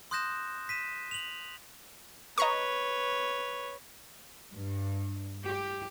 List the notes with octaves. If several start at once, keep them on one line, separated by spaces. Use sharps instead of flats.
C6 D#6 F#6 G6 A#6 E7
B6 D#7 E7
F7 F#7
B4 C#5 D#5 A#5 C#6
G2
G4